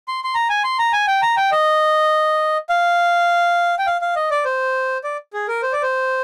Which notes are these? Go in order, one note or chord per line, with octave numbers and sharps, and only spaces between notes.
C6
C6
A#5
G#5
C6
A#5
G#5
G5
A#5
G5
D#5
F5
G5
F5
F5
D#5
D5
C5
D5
G#4
A#4
C5
D5
C5